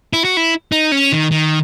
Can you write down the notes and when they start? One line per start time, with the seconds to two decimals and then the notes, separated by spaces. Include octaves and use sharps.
0.13 E4
0.24 F#4
0.37 E4
0.72 D#4
0.92 C#4
1.12 D#3
1.31 D#3